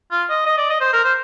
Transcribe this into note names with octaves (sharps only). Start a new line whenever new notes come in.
F4
D#5
D#5
D5
D#5
C5
A#4
C5